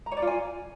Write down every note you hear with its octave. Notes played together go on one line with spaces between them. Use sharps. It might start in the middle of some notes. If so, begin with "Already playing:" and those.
A#5
C#5
D5
F4
G#5